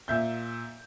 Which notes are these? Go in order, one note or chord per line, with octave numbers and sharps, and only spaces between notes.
A#2 E5 G6